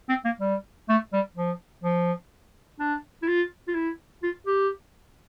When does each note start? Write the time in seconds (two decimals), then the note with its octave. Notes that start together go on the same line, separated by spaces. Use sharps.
0.09 C4
0.25 A#3
0.40 G3
0.89 A3
1.13 G3
1.37 F3
1.84 F3
2.80 D4
3.23 E4
3.28 F4
3.68 F4
3.75 E4
4.23 F4
4.46 G4